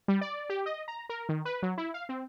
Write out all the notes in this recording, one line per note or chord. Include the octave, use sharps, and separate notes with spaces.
G3
D5
G4
D#5
A#5
A#4
D#3
B4
F#3
E4
F5
C4